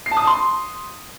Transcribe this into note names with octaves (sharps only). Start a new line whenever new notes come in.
C7
A5
D#6
A5
C6